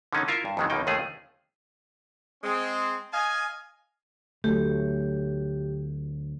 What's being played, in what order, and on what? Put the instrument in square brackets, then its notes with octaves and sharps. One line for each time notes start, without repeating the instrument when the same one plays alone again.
[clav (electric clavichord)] D3 D#3 C#4 D#4
E4 F4 A#4 E5
G2
F2 G#2 D#3 F#3 G#3 A3
C#2 B2 D#3 A#3 D#4 G5
D#2 D#3 F3 A3 G#4
[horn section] G#3 C4
D#5 F5 G#5
[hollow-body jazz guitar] D2 [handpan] F#3 A3 [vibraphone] G4